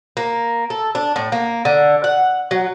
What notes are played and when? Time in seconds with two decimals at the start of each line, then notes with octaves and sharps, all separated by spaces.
0.17 A#3
0.70 A4
0.95 D4
1.16 A2
1.32 A#3
1.65 D3
2.04 F#5
2.51 F#3